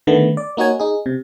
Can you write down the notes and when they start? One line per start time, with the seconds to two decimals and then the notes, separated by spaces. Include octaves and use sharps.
0.07 D3 D#3 A3 B3
0.37 D5
0.57 A#3 D#4 F#4 C#5 G#5
0.79 D#4 G#4
1.06 C3